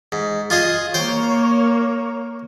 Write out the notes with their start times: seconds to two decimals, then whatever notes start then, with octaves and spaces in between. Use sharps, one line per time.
0.12 G#2
0.50 F4 G#4 D#5
0.94 A#3 C5 C#5 G5